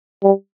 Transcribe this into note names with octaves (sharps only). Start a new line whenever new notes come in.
G3